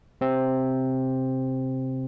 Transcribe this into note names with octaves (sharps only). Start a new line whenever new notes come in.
C3 C4